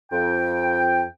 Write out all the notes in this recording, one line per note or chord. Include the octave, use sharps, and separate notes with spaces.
F2 G5